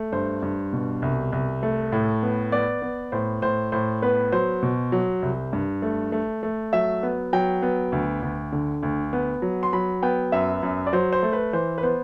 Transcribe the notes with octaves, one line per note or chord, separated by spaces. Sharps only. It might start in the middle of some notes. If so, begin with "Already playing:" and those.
Already playing: A3
G2 C5
G2
B2
C2
C2
A3
A2
B3
B3 D5
B3
A2 C5
A2 C5
A2 C5
B3 B4
F#3 C5
B2
F#3
C2
G2
A3
A3
A3
F#3 E5
B3
F#3 G5
B3
D2
D2
D3
D2
B3
F#3
C6
F#3 B5
B3 G5
F#2 E5
F#2
D5
F#3 C5
C5
A3
B4
E3 C5
B4
B3 C5